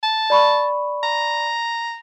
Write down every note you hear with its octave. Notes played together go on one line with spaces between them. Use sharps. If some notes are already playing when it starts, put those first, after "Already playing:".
A5
D5 B5 C#6
A#5